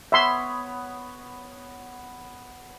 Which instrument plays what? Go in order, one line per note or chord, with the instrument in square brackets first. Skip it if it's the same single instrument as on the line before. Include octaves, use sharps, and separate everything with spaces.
[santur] B3 C#5 B5 [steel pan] E5 C6